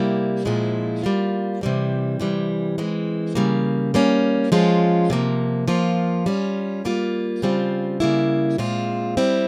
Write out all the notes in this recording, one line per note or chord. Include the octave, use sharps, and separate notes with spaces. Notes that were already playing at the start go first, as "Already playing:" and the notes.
Already playing: C3 G3 A#3 E4
A#2 F3 G#3 C4 E4
G3 A#3 F4
C3 E3 G3 C4
C3 E3 G3
E3 G#3 C4
C#3 G3 A#3
G3 A#3 C#4
F3 G#3 C#4 F4
C3 F3 A#3
F3 A#3 F4
G3 C#4 F4
G3 A#3 F4
C#3 G3 C4 F4
C#3 G3 A#3 E4
A#2 G#3 C4 F4
G3 C4 E4